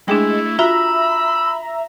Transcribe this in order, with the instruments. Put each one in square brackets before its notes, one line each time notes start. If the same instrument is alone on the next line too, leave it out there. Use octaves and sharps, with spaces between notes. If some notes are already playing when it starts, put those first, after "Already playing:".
[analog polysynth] G#3 [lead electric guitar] A3 [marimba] D4 G#4 G5 [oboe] E4
[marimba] F4 F#4 [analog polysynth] E5 A#5 [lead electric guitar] B5 [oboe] E6